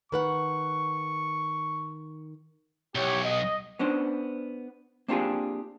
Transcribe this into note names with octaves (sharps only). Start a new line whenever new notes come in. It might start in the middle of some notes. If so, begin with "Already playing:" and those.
D#3 B4 F#5 C#6
B1 E3 G4 C#5
D#5
B3 C#4 D4 C5
A#3 C4 D4 F4 G4 G#4